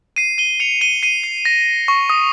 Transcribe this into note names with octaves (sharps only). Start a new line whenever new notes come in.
C7 D#7
D#7 G7
C#7 F7
D#7 G7
C7 D#7
C7
A#6
C#6
D#6